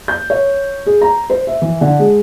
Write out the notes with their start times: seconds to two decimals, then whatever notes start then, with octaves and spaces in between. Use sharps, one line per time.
0.08 G6
0.30 C#5
0.87 G#4
1.02 A#5
1.30 C5
1.47 E5
1.62 E3
1.81 D3
1.99 G#3